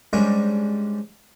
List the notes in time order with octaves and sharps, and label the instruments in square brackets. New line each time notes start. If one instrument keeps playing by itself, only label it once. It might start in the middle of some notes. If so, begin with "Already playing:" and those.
[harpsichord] G#2 G3 G#3 C#4 D4